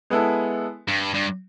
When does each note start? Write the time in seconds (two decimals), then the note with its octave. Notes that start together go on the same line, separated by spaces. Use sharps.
0.10 G#3 B3 E4 A4
0.88 G2
1.14 G2